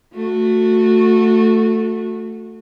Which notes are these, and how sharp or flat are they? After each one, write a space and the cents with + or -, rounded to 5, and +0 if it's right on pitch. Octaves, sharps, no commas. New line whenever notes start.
A3 +10 F#4 -20